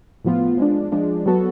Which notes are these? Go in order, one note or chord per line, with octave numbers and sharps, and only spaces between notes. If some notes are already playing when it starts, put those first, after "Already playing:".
A2 F3 B3 F4
F3 G#3 D4
F3 G#3 D4
F#3 B3 F#4 A4